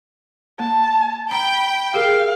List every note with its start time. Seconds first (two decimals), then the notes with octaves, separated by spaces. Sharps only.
0.59 A#3 A5
1.31 G5 A#5 B5
1.94 G4 G#4 A#4 F5